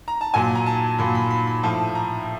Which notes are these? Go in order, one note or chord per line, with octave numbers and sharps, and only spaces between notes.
A#5
A5
A#2 F#3 G#5
A#5
A5
A#2 F#3 B5
B5
B5
B5
A2 F3 A5
A#5